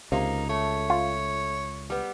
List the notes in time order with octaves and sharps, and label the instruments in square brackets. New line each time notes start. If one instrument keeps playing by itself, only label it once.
[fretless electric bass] C#2 [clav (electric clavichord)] C3 [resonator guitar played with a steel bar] A#3 [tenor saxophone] D#4
[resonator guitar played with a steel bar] A3 [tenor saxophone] C#5
[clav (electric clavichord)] F4
[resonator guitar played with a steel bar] G3 B3